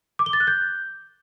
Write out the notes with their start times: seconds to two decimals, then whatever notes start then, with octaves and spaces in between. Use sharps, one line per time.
0.19 D6
0.26 G7
0.33 A6
0.40 F#6
0.47 G6